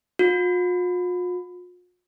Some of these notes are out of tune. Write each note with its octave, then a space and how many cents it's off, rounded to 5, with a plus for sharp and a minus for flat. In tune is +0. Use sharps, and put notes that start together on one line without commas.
F4 +45